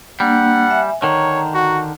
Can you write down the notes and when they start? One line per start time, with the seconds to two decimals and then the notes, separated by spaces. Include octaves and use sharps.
0.20 G3 A#3 D4 F#5
0.67 E5 G#5
1.02 D3 D#3 C#5 A#5
1.54 F#4